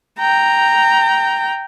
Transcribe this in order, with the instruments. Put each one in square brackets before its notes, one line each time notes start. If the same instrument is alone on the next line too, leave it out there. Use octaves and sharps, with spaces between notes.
[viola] G5 A#5